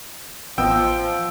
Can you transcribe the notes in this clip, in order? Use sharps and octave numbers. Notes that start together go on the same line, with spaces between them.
A1 F3 B3 D#5 G5 E6